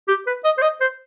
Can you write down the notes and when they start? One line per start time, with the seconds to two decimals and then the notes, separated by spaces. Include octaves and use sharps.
0.08 G4
0.27 B4
0.45 D#5
0.58 C5
0.62 D#5
0.81 C5